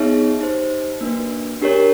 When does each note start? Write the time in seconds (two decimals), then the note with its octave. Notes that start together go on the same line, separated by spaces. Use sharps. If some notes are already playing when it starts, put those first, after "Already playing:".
Already playing: B3 D#4 G#4 C#5 E5
0.41 D#4 G4 C5
1.01 A#3 D4 F#4 B4
1.61 D4 G4 A#4 C#5